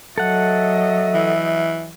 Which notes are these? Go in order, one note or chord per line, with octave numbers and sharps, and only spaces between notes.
F#3 A4 D#5 E5 F#5
E3